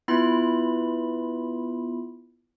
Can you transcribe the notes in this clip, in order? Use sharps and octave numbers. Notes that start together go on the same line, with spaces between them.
B3 E4 F4 B4 B5